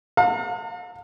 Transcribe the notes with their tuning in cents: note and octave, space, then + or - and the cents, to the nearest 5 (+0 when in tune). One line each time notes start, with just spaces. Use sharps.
F5 +45 A#5 -45